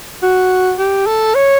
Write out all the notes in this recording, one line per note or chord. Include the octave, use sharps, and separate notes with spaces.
F#4
G4
A4
C#5